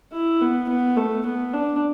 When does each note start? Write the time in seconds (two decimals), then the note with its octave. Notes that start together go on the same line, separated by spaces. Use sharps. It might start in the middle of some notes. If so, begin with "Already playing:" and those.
0.12 E4
0.41 B3
0.69 B3
0.97 A3
1.26 B3
1.53 D4